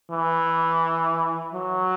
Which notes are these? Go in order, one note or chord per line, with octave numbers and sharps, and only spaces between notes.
E3
F#3